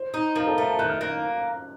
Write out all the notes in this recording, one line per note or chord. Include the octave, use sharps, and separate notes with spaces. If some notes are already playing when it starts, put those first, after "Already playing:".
Already playing: C5
D#4
F3 A#4
A4
A3 A#4
A5
D#3 F#6
F6
A#3 F#6